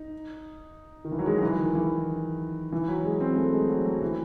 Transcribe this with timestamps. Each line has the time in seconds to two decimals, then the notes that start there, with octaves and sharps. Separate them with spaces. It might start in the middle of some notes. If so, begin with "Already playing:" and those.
Already playing: D#4
1.05 D#3
1.12 E3
1.19 F#3
1.26 G#3
1.38 F#3
1.42 E3
1.58 D#3
1.75 E3
2.72 E3
2.88 F#3
3.05 G#3
3.20 C4
3.36 A3
3.53 G#3
3.69 F#3
3.85 F#3
4.02 E3